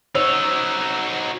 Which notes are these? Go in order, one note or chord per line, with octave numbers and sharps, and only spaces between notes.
F#3 D#4 C5 C#5 E6 F7